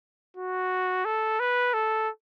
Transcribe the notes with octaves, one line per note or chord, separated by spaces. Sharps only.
F#4
A4
B4
A4